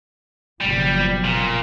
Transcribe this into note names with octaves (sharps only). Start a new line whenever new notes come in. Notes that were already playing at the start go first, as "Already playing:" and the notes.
F#1 B2 F3 G3
A#2